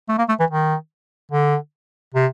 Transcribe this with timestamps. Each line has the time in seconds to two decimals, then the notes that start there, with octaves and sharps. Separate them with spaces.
0.09 A3
0.18 A#3
0.29 A3
0.40 E3
0.50 D#3
1.31 D3
2.14 C3